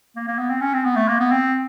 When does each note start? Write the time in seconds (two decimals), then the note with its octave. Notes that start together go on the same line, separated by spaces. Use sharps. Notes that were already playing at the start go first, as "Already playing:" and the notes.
0.16 A#3
0.27 A#3
0.39 B3
0.50 C4
0.61 C#4
0.74 C4
0.85 B3
0.96 A3
1.08 A#3
1.20 B3
1.31 C4